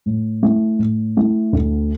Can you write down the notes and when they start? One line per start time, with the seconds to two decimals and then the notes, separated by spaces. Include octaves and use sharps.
0.06 A2
0.43 A3 E4
0.79 A2
1.17 A3 E4
1.53 D2